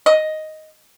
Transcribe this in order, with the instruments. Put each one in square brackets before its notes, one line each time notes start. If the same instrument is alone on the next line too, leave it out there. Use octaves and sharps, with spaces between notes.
[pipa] D#5